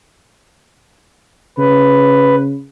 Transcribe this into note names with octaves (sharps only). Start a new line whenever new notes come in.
C#3 B4